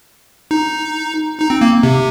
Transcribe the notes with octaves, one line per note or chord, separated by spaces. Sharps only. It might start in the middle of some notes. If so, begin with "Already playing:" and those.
D#4
D#4
C4
A#3
C3